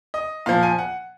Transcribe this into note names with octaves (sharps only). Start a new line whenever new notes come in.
D#5
A#2 F3 F5
G#5
F#5